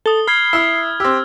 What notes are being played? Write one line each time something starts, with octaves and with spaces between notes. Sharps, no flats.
A4 D#6 G7
B5 F6 G#6 C7 G7
E4 E6
C4 G4 E6